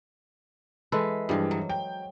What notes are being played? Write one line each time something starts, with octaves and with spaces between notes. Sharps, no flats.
E3 G#3 A4 B4
G2 E3 F3 G3 G#4
F#3
G5